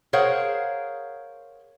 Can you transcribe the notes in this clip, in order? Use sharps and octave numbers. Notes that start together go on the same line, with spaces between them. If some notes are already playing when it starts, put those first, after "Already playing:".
G#4 A#4 C5 C#5 F5 F#5